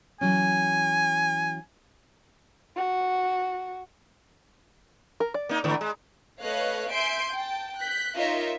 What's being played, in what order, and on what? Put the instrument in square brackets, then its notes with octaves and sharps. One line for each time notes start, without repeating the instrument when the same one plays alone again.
[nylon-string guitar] E3 F#3 C#4 [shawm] G#5
[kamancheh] F#4
[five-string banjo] A#4
D5
[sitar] A#3 D#4
G#2 D3 E3
G#3
[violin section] A3 B4 C#5 D#5 F5 F#6
E5 G#5 C6 G6 C7 D7
G5 A5
F#6 G6 B6
D#4 F4 A#4 C#5 D#5 E5